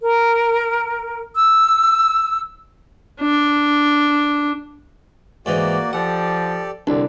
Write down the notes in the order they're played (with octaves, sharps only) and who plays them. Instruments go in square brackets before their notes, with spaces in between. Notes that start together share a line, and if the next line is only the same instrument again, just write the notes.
[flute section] A#4
E6
[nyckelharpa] D4
[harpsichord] G#2 E3 D#4 [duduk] A#3 [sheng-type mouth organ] F#4 D5
[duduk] F3 [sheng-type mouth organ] G4 A4 D5 [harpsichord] F#5
[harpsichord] C2 [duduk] D3 [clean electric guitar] D4 E4 D5